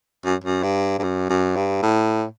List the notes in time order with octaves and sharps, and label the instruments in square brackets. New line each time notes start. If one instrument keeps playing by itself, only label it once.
[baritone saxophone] F#2
F#2
G2
G2
F#2
F#2
G2
A2